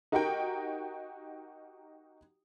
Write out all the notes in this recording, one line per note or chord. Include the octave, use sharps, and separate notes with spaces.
D#4 F#4 G4 A#4 F#5 G5